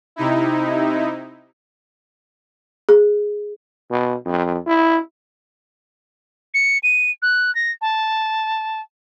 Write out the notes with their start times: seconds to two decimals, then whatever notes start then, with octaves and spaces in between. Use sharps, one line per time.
0.16 C3 D#4 E4
2.89 G#4
3.91 B2
4.25 F2
4.67 E4
6.54 C#7
6.83 D#7
7.22 F#6
7.55 A#6
7.81 A5